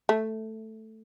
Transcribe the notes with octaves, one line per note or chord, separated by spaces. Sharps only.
A3